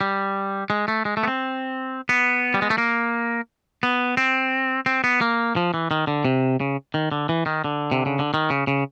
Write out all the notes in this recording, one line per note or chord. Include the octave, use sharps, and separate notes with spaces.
G3
G#3
A3
G#3
A3
B3
C4
B3
G3
G#3
A3
A#3
B3
C4
C4
B3
A#3
F3
E3
D#3
D3
C3
C#3
D#3
D3
E3
D#3
D3
C3
C#3
D3
D#3
C#3
C#3